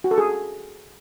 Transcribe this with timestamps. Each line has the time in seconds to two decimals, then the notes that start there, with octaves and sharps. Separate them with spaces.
0.04 F#4
0.11 A4
0.18 G#4